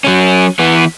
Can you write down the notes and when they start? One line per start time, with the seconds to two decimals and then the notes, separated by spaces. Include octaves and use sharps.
0.04 F#3 C#4
0.59 E3 B3